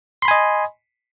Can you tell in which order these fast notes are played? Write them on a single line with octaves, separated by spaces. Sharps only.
C6 B5 G#5 D#5